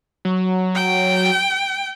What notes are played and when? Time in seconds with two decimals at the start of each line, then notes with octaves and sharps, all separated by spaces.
0.25 F#3
0.75 G5